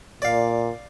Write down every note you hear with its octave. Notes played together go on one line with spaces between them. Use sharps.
A#2 D5 F5